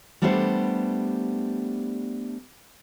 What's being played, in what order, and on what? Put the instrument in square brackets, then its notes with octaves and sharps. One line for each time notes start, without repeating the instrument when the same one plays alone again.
[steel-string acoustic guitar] G3 A3 B3 D4 G4 C5